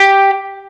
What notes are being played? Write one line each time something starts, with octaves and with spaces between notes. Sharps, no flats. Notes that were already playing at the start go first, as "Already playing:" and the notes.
Already playing: G4